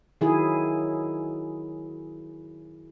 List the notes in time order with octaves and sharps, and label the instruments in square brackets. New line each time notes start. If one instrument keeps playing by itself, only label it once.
[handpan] D#3 F#3 E4 G#4